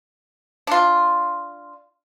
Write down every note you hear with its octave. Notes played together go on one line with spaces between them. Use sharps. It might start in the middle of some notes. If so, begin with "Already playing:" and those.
D4 F4